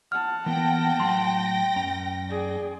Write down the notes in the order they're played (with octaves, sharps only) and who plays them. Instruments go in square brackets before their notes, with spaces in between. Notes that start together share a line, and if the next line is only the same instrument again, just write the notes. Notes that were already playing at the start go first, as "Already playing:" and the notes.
[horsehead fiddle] F#5 A5 [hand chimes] F6
[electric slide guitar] E3 A#3 B3 [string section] G5 A#6
[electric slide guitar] A2 F#3 [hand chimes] C6
[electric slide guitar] F#2 C#4 A#5
[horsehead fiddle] G#4 D5